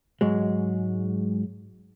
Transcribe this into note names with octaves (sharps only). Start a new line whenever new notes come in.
G#2 F#3 G#3